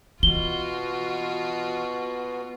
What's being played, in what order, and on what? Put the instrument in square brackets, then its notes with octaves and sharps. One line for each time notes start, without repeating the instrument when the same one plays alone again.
[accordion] B2 [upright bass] E3 [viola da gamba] F4 F#4 [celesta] G7